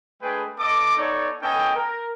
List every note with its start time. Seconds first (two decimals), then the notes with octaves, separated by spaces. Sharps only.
0.22 G#3 A3 D4 G#4 B4 G5
0.58 B3 A4 D#5 D6
0.97 B3 D#4 A4 C#5 D5
1.42 B3 C#4 A4 D#5 G5
1.75 A#4